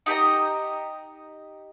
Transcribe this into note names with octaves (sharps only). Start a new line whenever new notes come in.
D#4 G4 D#5 A#5